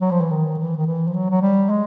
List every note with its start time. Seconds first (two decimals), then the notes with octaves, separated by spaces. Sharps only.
0.01 F#3
0.11 F3
0.21 E3
0.31 D#3
0.59 E3
0.77 D#3
0.86 E3
1.07 F3
1.14 F#3
1.30 F#3
1.42 G3
1.70 G#3